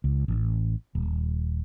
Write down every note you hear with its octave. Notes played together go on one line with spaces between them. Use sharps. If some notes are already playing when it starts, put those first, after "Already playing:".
C#2
A1
D#1